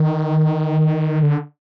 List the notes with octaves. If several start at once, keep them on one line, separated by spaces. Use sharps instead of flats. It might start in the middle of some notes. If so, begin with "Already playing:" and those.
Already playing: D#3
D3